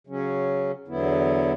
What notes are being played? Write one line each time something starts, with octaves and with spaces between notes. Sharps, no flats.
C#3 F#3 C#4
E2 D3 F#3 B3 E4